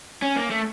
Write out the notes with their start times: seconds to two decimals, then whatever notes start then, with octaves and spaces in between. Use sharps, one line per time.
0.22 C#4
0.36 A#3
0.50 A3